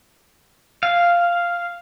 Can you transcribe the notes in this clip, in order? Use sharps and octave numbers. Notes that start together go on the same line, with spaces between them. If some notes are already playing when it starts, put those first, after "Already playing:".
F5